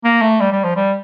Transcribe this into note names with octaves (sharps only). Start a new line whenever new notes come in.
A#3
A3
G3
G3
F3
G3